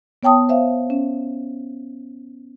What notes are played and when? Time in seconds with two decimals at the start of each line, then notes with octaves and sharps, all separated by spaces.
0.23 B3 C#5 G5 A5 D#6
0.49 C5 E5 F5
0.90 C#4